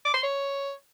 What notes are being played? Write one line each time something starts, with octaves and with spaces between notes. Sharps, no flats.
D6
C6
C#5